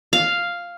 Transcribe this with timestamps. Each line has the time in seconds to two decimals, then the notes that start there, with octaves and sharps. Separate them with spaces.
0.13 F5